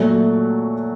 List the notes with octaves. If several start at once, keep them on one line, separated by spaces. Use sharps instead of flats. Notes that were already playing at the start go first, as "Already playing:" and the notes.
Already playing: A#2 F#3 A3